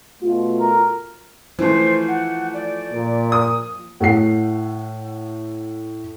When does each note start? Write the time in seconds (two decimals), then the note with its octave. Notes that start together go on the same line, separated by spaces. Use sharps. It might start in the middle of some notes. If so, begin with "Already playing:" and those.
0.21 B2 A3 F4
0.60 A#4
1.59 E3 F3 A3 C5
2.07 F#5
2.53 D5
2.93 A#2
3.32 D#6
4.00 A2 A3 F#5 C7